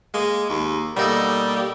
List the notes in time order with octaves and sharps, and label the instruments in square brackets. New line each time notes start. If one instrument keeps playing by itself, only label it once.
[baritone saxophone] G#3 [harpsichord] A#3
[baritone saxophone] D#2
[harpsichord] B2 D#4 A4 [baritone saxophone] G3 [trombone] A#3